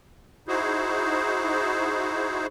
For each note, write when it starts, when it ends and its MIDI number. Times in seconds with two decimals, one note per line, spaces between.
0.48 2.47 63
0.48 2.47 64
0.48 2.47 66
0.48 2.47 68
0.48 2.47 72